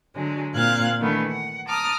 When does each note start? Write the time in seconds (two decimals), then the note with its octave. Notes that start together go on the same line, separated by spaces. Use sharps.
0.14 D3 F#3 G#3
0.54 A#2 C4 F4 F5 F#6 G#6
1.00 D#3 E3 A3 B3 D4
1.29 F#5
1.67 A5 A#5 D6 D#6 F6